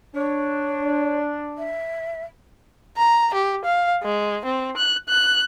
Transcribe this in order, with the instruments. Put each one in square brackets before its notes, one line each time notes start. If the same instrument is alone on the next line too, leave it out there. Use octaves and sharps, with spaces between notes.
[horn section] D4 [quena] C#5
[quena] E5
[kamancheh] A#5
G4
F5
G#3
C4
F#6
F#6